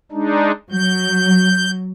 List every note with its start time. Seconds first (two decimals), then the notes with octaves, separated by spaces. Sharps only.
0.12 G#3 D4 D#4
0.72 F#3 G6